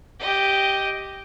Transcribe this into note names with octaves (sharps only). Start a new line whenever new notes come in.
G4 D#5